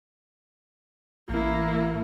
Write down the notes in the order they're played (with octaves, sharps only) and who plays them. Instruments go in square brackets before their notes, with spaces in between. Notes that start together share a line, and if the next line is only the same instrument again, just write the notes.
[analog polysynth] A1 [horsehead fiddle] A#3 E4